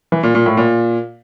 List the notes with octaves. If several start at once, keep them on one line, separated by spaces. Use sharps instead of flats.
E3
A#2
A#2
A2
A#2